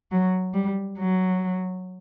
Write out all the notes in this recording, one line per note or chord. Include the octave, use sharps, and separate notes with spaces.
F#3
G3
F#3